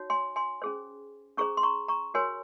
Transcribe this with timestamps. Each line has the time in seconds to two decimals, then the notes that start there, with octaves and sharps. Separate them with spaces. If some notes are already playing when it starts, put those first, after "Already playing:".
Already playing: D#4 F#4 C#5
0.10 G#5 C6
0.36 G#5 C6
0.62 C#4 G#4 C5
1.37 C#4 G#4 C5 A#5 C#6
1.57 C6
1.63 A#5 C#6
1.88 A#5 C#6
2.14 F#4 A#4 C#5 G#5 C6